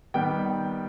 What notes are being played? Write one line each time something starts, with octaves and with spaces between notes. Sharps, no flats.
D#3 G3 B3 G5